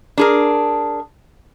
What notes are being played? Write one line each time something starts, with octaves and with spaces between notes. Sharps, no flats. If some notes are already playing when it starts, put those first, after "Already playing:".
D4 G#4 A#4